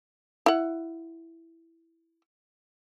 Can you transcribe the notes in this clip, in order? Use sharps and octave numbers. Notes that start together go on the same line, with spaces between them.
E4 F#5